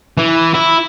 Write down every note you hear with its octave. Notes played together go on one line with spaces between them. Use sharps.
E3
E4